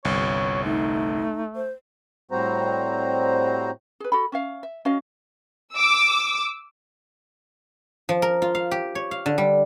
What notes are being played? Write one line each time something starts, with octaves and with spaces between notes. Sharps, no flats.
G1 C2 C#5
A3 D#4
C5
A2 G3 C4 F#4 C5 A#5
G#4 B4
F#4 A4 B5
C#4 E5 F5
E5
C#4 F#4 D#5 F5
D6 E6
F3
A#4
F4
F5
G4
C#5
F5
D3
G3